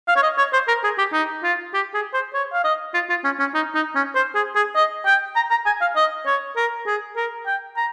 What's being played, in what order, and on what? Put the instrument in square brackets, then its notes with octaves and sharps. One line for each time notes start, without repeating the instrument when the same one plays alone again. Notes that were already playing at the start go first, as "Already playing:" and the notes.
[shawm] F5
C#5
D#5
C#5
C5
A#4
G#4
G4
D#4
F4
G4
G#4
C5
C#5
F5
D#5
F4
F4
C#4
C#4
D#4
D#4
C#4
C5
G#4
G#4
D#5
G5
A#5
A#5
G#5
F5
D#5
C#5
A#4
G#4
A#4
G5
A#5